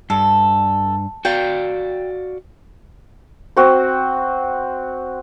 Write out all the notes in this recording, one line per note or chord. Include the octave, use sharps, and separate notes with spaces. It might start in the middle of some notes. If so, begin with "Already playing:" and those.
G2 A4
F#4 D5 F5 G5
C4 F#4 C5